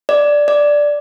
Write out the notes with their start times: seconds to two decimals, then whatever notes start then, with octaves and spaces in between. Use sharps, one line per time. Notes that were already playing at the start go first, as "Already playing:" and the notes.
0.09 D5
0.48 D5